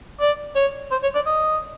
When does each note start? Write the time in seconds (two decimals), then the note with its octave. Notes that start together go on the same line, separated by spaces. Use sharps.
0.20 D5
0.56 C#5
0.91 C5
1.03 C#5
1.15 D5
1.26 D#5